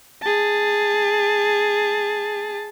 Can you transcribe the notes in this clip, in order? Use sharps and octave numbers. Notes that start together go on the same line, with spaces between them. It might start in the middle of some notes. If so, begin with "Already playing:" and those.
G#4 A5